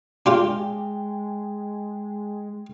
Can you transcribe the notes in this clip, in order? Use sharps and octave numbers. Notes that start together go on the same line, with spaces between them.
G#3 D4 F4 G4 G5